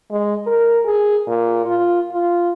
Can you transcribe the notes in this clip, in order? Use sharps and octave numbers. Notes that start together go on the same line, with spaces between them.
G#3
A#4
G#4
A#2
F4
F4